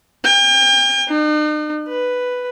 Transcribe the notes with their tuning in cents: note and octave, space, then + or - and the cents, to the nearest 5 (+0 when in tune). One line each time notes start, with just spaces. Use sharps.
G5 +40
D#4 -45
B4 +5